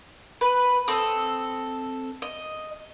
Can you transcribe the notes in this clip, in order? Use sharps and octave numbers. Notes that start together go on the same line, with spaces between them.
B4
C4 A4 D#6
D#5